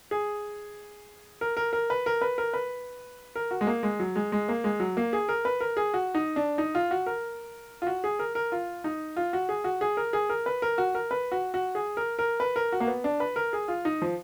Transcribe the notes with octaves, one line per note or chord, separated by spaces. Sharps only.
G#4
A#4
A#4
A#4
B4
A#4
B4
A#4
B4
A#4
F#4
G#3
A#3
G#3
F#3
G#3
G#3
A#3
G#3
F#3
A#3
G#4
A#4
B4
A#4
G#4
F#4
D#4
D4
D#4
F4
F#4
A#4
F4
F#4
G#4
A#4
A#4
F4
D#4
F4
F#4
G#4
F#4
G#4
A#4
G#4
A#4
B4
A#4
F#4
A#4
B4
F#4
F#4
G#4
A#4
A#4
B4
A#4
F#4
A#3
B3
D4
B4
A#4
G#4
F4
D#4
F3